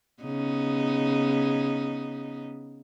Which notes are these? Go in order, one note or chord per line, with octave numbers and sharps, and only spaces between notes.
C#3 B3 D#4